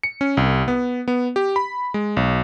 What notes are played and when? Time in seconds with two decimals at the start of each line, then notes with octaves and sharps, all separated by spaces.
0.03 C#7
0.21 C#4
0.37 C2
0.68 B3
1.08 B3
1.36 G4
1.56 B5
1.94 G#3
2.17 B1